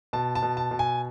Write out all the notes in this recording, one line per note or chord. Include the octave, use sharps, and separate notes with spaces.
B2 A5
A5
B2
A5
B2
G#5